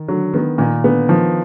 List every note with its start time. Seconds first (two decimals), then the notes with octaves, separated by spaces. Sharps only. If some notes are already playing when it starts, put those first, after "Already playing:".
Already playing: D#3
0.08 D3 F#3
0.33 D#3 B3
0.58 A#2 D#3
0.84 D3 B3
1.09 D#3 F3